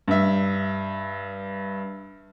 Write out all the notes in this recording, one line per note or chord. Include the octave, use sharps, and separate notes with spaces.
G2 E5